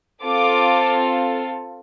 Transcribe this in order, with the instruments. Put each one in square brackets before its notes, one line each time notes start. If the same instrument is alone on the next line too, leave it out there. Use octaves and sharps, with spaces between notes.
[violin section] C4 F4 A4 D6